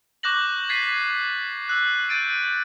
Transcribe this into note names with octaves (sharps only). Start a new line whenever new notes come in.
C#6 D6 F#6 G6 A#6 F#7
G#6 A6 B6 C7 D#7
E6 F#6
G6 A6 D7 D#7